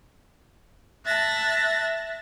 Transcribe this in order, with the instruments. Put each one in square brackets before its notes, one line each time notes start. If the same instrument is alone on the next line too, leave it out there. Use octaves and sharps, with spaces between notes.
[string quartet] E5 A5 F#6 A6 A#6